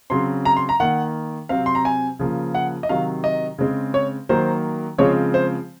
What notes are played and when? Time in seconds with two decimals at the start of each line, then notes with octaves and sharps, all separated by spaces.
0.10 C#3 F#3 C4 C6
0.45 A#5
0.57 C6
0.69 A#5
0.80 D#3 A#3 F#5
1.49 C3 F#3 C4 F5
1.66 C6
1.75 A#5
1.85 G#5
2.19 C#3 F3 A#3
2.55 F#5
2.83 D#5
2.89 C3 D#3 F#3 F5
3.24 D#5
3.58 C#3 G#3 C4
3.94 C#5
4.29 D#3 F#3 A#3 C5
4.98 C#3 F3 G#3 C4 C#5
5.34 C5